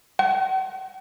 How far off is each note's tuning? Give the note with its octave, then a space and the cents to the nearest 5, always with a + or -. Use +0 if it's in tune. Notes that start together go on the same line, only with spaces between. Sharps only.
F#5 +45